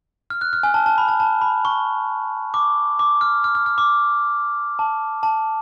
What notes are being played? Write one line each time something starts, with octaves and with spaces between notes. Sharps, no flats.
F6
F#6
F6
G#5
A5
A5
B5
A5
A5
B5
C#6
D6
D6
F6
F6
F6
F6
D6
A5
A5